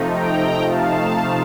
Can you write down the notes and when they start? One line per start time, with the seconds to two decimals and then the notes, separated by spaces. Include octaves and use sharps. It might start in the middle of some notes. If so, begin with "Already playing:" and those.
Already playing: C3 F3 A3 D#4
0.12 G5 A#5
0.69 F5 A5